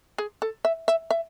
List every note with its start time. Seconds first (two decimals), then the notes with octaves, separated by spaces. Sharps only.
0.18 G#4
0.42 A4
0.65 E5
0.88 E5
1.11 E5